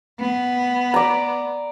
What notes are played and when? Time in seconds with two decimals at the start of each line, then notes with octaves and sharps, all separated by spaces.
0.20 B3
0.94 D5 A#5